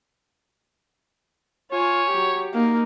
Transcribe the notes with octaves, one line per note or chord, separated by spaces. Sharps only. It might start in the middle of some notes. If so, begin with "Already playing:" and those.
F4 C#5 G#5
F#3 G4
A#3 D#4